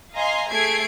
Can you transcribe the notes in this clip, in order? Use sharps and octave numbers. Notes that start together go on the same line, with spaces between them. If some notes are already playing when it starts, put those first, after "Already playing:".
D#5 F5 G#5 A#5 C6
A3 G#4 E5 G#6 C7 D7